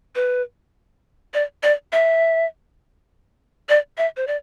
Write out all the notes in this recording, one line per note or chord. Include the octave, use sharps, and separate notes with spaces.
B4
D5
D5
E5
D5
E5
C5
D5